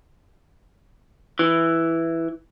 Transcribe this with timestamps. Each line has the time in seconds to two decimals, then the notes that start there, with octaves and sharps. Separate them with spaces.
1.39 E3